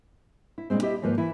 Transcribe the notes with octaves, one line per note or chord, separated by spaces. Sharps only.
E4
G2 A#2 G#3 C4
E4 G4 D#5 E5
D#2 G#2 F3 A#3 B4
E3 E4